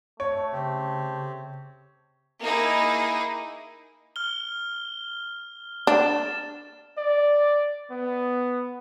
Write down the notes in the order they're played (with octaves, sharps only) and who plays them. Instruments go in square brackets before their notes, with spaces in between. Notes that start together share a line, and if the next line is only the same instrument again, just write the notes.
[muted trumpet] A3 [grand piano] C#5
[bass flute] C#3 [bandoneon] C4 G4
[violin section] A#3 D#4 E4 G#4
[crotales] F6 G7
[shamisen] D4 [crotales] A6 E7
[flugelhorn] D5
B3